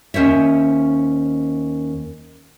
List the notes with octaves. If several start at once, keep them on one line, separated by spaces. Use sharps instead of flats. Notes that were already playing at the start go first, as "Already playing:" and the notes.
D#2 C#4 C5 C#5 E5